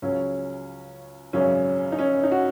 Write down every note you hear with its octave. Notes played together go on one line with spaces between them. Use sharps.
C#2 C#3 F#3 C#4
G#1 F#2 C#3 F#3 C#4
D#4
C#4
D#4
F#4